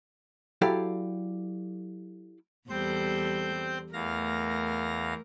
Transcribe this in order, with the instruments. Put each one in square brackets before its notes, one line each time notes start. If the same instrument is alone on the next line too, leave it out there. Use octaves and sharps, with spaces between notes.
[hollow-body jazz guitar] F#3 E4 G4 A4 D5 F5
[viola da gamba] E2 G3 A4 [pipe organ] C4 C5 G6
[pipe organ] E2 F5 A#6 [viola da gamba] A3 A#4